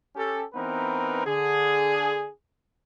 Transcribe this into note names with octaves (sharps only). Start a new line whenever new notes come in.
C#4 G4 A4
E3 B3 C4 D#4 A#4 B4
D3 G#4